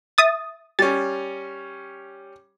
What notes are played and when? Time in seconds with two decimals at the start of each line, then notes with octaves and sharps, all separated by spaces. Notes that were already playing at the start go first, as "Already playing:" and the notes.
0.18 E5 D#6 A6
0.79 G3 C#4 A6